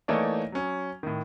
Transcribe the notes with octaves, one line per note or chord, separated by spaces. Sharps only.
E3 A3 A#3 D#4 C#5 D5
F#3 C#4
A2 D#3